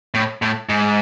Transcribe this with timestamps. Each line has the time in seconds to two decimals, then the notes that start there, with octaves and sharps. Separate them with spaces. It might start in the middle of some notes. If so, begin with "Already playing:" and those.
0.14 A2
0.42 A2
0.69 G#2